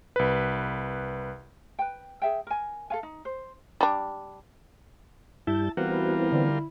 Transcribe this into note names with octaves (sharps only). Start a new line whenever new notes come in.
C2 B4
B4 G5
G#4 E5 G5
A#4 G#5
A4 F5 G#5
D#4
C5
G3 D4
G2 G3 E4 A5 G6
E3 G3 B3 C4 F4 F#4 A#4
E4
D3